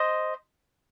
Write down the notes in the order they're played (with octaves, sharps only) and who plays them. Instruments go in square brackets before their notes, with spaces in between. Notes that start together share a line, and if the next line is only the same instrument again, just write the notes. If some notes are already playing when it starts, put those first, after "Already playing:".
Already playing: [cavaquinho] C5 D#5